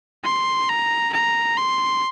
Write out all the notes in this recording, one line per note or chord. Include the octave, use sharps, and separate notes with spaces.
C6
A#5
A#5
C6